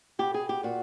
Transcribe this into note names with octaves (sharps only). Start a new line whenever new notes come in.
B2 G4
G#4
G4
A#2 F#4